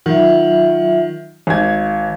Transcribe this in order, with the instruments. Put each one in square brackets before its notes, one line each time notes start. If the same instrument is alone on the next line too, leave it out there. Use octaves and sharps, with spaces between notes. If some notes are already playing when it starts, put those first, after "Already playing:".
[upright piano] D#3 [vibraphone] F#3 F4 E5
[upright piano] G#1 G#6 [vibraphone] F5